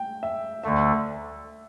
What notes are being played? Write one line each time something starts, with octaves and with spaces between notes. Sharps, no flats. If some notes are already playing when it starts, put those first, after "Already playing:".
Already playing: G5
E5
D2 D3 A3 E5